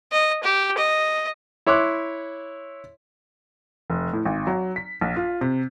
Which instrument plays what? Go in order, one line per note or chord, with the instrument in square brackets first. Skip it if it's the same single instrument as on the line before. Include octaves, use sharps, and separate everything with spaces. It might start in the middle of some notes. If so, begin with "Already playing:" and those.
[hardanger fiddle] D#5
G4
D#5
[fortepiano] E4 C#5 C6 D6 F#6
[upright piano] F1
A2
G#1
F#3
B6
A#1
F4
C3